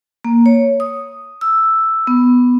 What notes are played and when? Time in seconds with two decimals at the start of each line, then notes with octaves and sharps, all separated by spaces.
0.25 A#3
0.46 C#5
0.80 D#6
1.41 E6
2.07 B3